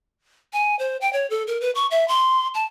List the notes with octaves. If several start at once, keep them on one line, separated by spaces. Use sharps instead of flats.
G#5
C5
G5
C#5
A4
A#4
B4
C#6
E5
C6
A5